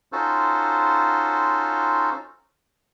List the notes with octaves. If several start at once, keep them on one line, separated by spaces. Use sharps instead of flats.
C#4 D#4 F4 F#4 A4 C5